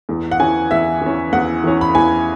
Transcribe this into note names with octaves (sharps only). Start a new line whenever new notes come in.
E2
F#5
E3 C#4 G#5
E2 E5
E3 C#4
E2 F#5
E3 C#4
B5
E2 G#5